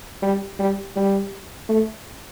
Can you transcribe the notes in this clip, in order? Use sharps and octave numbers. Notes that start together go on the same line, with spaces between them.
G3
G3
G3
A3